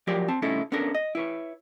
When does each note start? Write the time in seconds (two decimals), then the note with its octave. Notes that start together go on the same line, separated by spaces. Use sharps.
0.07 F3 F#3 G4 A#4 D5 G5
0.28 C4 A5
0.42 C2 A2 C#4 D#4 E4 A4
0.72 B3 C#4 D4 A4 A#4
0.95 D#5
1.15 E4 B4 C#5